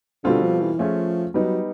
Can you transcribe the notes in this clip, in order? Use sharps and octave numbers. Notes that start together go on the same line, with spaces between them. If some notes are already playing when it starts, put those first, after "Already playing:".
B2 D3 G3 C4 F4 A4
F3
E3
F3 A3 C#4 F4 G#4
F#3 G3 B3 D#4